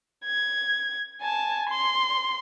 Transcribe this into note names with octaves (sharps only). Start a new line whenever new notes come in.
G#6
G#5 A5
C6